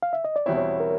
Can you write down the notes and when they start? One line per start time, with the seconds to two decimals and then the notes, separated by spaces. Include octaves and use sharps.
0.03 F5
0.13 E5
0.25 D#5
0.36 D5
0.46 E2 B2 G3 C4 E4 C#5
0.57 C#5
0.80 A#4